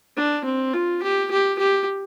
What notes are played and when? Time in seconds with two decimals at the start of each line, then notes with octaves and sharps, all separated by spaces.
0.16 D4
0.45 C4
0.73 F4
1.02 G4
1.31 G4
1.59 G4